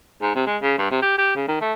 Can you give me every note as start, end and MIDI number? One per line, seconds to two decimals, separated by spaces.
0.21 0.31 44
0.35 0.46 48
0.46 0.56 56
0.62 0.74 49
0.78 0.86 43
0.91 1.01 48
1.02 1.16 67
1.18 1.36 67
1.36 1.44 49
1.48 1.56 51
1.61 1.73 57